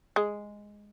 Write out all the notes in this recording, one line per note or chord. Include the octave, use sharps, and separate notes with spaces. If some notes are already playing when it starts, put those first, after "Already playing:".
G#3